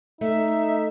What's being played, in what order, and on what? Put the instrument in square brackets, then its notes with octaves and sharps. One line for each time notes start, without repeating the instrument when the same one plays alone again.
[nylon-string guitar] A3 [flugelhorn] D#4 [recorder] E5